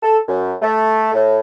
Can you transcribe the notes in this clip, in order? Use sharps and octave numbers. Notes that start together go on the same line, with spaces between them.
A4
F#2
A3
A2